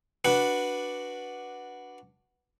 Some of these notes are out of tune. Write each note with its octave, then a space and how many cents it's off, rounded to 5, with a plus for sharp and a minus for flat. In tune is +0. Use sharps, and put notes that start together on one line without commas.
D4 +0 F#4 +0 B4 -10